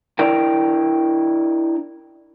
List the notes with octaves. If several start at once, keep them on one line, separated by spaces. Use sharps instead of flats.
D4 E4 A#4 D5 G5